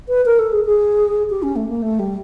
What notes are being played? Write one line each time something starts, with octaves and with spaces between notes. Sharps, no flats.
B4
A#4
A4
G#4
G#4
G4
C#4
A3
A#3
A3
G3